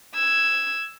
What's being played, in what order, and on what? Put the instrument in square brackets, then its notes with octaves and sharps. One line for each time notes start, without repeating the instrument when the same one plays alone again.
[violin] E6 G#6